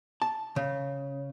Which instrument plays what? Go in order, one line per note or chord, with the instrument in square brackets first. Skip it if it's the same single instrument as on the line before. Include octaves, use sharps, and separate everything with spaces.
[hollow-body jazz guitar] A5
C#3